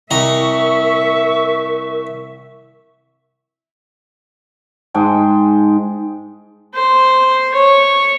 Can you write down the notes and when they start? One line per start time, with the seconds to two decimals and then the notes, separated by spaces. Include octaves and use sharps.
0.11 C2 A#4 D#5 E5 A#5 C#6
4.94 G#2 G#3 G5 A5
6.74 C5
7.53 C#5